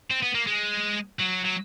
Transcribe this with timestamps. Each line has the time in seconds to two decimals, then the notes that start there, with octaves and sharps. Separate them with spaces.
0.11 C4
0.23 B3
0.35 A#3
0.47 G#3
1.19 F#3
1.45 F#3